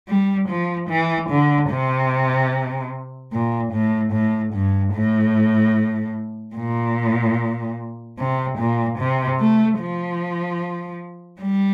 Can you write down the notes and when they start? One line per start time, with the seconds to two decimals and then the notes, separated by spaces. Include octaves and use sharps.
0.08 G3
0.49 F3
0.89 E3
1.30 D3
1.70 C3
3.32 A#2
3.72 A2
4.13 A2
4.54 G2
4.94 A2
6.56 A#2
8.18 C3
8.58 A#2
8.98 C3
9.39 A3
9.79 F3
11.41 G3